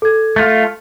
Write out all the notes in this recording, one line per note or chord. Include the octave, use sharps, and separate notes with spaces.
A4 G#6
A3 F4